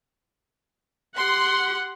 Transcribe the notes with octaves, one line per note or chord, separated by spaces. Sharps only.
G4 F#5 C6